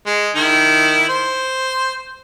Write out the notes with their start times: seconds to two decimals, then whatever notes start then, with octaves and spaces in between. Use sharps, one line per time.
0.07 G#3
0.35 D#3 E4
1.09 C5